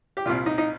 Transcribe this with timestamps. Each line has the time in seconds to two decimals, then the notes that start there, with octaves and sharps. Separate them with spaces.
0.17 G4
0.26 C2 A#2 F4
0.46 D#4
0.58 D#4